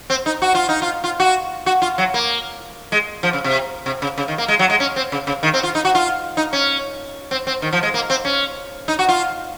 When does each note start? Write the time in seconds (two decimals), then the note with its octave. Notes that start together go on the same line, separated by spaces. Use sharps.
0.10 C4
0.26 D#4
0.42 F#4
0.55 F4
0.69 D#4
0.82 F4
1.04 F4
1.20 F#4
1.66 F#4
1.82 F4
1.98 F#3
2.14 A#3
2.92 G#3
3.23 F3
3.33 C#3
3.44 C3
3.86 C3
4.02 C#3
4.18 C#3
4.28 D#3
4.38 A#3
4.48 G#3
4.59 F#3
4.70 G#3
4.80 C#4
4.96 C4
5.12 C#3
5.27 C#3
5.43 D#3
5.54 C4
5.63 F4
5.75 D#4
5.85 F#4
5.95 F4
6.37 D#4
6.53 C#4
7.31 C4
7.47 C4
7.62 D#3
7.73 F3
7.83 G#3
7.94 A#3
8.10 C4
8.25 C#4
8.88 D#4
8.99 F#4
9.09 F4